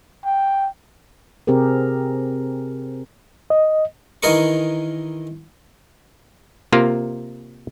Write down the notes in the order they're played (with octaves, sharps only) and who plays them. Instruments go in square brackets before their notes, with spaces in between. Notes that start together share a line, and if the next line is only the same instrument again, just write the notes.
[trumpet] G5
[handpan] C3 C4 G4 G#4 A#4
[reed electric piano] D#5
[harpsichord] D#3 E3 G#4 A#4 D#5 C#6
[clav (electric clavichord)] C3 A#3 F4 A#4